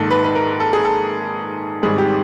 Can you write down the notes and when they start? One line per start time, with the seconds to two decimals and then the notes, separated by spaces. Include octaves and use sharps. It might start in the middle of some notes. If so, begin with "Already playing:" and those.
Already playing: A#1 G#2 D#3 A4
0.10 B4
0.25 B4
0.35 A#4
0.60 A4
0.73 G#4
0.85 A4
1.82 G#1 G#2 D#3 G3 C4 G#4
1.98 G4